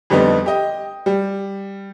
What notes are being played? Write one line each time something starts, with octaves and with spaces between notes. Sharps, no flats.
F2 D3 G3 B3 D#4
G4 D#5
G3